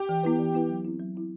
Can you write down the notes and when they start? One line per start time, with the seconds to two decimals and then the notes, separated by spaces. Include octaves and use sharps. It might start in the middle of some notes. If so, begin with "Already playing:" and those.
Already playing: G4
0.09 E3
0.23 B3 E4 B4
0.38 E3
0.54 B3 E4 B4
0.69 F#3
0.84 C4 E4
1.00 F#3
1.15 C4 E4